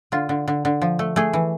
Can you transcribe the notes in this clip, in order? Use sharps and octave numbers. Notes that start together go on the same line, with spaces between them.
D3 F4
D3
D3
D3
F3
A3
A3 G#4
E3